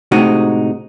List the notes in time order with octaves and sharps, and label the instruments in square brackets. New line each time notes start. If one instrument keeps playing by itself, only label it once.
[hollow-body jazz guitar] A2 C3 G#3 D#4 F#4